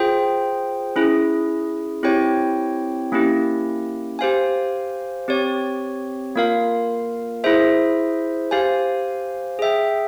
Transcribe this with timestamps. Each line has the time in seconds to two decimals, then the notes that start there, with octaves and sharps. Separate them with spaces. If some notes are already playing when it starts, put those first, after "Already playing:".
Already playing: F4 G#4 C5 G5
0.96 C#4 E4 G#4
2.03 C4 E4 G4 C#5 G5
3.12 A#3 C#4 E4 G4
4.19 G4 C5 F5 G#5
5.28 C4 G4 C#5
6.35 A#3 F4 A#4 F5
7.44 E4 G#4 C5 E5
8.51 G4 C5 F5 G#5
9.59 G#4 E5 G5